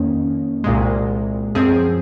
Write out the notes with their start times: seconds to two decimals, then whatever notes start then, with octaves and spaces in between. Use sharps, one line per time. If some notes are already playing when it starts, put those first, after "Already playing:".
Already playing: F2 D#3 A#3 C#4
0.64 C2 A#2 G#3
1.55 F#2 F3 C4 G#4